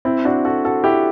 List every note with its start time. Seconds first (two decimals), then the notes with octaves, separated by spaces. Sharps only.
0.05 C4 E4
0.25 D4 F#4
0.45 F#4 A4
0.65 F#4 A4
0.84 E4 G4